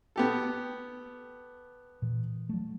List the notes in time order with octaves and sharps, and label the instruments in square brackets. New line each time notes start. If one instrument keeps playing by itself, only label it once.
[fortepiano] B3 G4 A4
[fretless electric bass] A#2 E3
F#3 A3